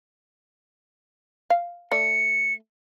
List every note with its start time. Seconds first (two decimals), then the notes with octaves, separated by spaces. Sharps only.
1.50 F5
1.91 A3 D5 C#7